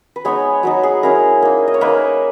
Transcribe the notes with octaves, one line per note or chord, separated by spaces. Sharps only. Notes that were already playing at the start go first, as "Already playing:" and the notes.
B4
G#3 B3 D#4 C#5
F#3 B3 D#4
G#4
G#3 C#4 E4 A#4
A#3 D#4
D#5
C#5
A#3 D#4 B4